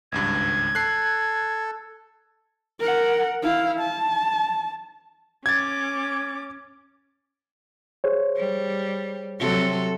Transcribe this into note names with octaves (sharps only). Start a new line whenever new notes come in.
G#1 C#2 G2 G#6
A4 F#6 C7
A#4 F#5
E4 F5
A5
C#4 D6 G#6 A6
G#4 C5 C#5
G3
C3 F#3 A4